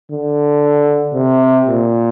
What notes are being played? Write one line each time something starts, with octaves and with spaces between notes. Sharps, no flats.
D3
C3
A#2